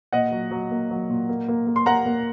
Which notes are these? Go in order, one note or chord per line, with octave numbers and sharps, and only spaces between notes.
A#2 D#5 F#5
F#3
F#3
A#3
F#3
A#2
A#3
A#3
A#3
C6
A#3 F#5 A#5
A#3